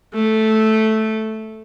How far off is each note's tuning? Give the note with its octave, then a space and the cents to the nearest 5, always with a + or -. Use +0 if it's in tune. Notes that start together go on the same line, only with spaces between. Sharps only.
A3 -5